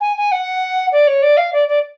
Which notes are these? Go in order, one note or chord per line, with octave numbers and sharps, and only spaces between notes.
G#5
G#5
F#5
D5
C#5
D5
F5
D5
D5